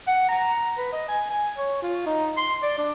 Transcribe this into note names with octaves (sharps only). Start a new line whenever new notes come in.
F#5
A#5
B4
D#5
G#5
G#5
C#5
F4
D#4
C6
D5
D4